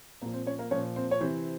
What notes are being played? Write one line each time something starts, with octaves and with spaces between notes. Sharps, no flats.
A#2 F3 A#3 A#4
C4 C5
C#4 C#5
A#3 A#4
A#2 F3 C#4 C#5
C4 C5
C#5
C3 E3 C4 C5